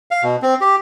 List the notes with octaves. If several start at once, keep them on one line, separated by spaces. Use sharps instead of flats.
F5
B2
C4
G4